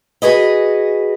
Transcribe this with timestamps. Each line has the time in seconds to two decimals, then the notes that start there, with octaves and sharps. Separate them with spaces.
0.22 F#4 G#4 B4 D#5